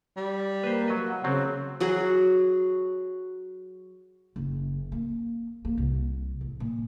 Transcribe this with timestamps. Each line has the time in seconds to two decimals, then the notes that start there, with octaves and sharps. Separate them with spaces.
0.16 G3
0.64 A#3 B4 C5
0.88 F#3 D#5
1.07 F#5
1.24 C#3 F#3 C4
1.80 F#3 F#4 G#4
4.36 F#1
4.92 A#3
5.65 A#3
5.78 C2
6.41 A1
6.60 A#2